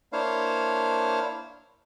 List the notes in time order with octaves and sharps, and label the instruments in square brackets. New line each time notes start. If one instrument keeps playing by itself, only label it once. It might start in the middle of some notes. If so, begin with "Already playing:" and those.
[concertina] A#3 D4 E4 C5 C#5 F5